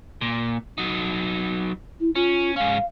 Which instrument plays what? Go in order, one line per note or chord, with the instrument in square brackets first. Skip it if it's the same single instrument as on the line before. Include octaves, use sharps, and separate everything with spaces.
[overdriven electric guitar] A#2
F#3 D#4
[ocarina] E4
[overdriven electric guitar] C#4 [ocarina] F4
[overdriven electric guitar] G#2 C#4 [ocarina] F5